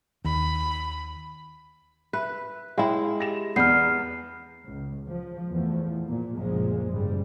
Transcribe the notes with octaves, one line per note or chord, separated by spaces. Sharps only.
D#2 B5
B4 E5
G#3 E4 C#5 F5 G5
G4 A#6 E7
E2 B3 D5 F6 G6 C7
C#2
F3
E2 F3 A3
A#2
C#2 F#2 A#2 F3 G#3
F#1 G#2 C#3 G3